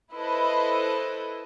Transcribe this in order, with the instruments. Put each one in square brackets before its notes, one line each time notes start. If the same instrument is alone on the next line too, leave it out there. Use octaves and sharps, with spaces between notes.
[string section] E4 A4 B4 C5 D#5